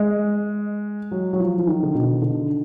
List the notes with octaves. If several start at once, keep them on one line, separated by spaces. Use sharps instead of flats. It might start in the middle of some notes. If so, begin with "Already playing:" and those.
Already playing: G#3
F#3
F#3
F3
F3
D#3
D3
B2
D3